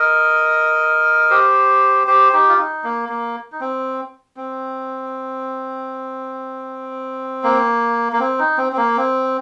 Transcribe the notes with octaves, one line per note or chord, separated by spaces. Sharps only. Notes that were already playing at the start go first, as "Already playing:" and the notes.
Already playing: A#4 D#5
G4 C5
G4 C5
D#4 G4
F4
D#4
A#3
A#3
D#4
C4
C4
A#3
A#3
C4
D#4
C4
C4
A#3
C4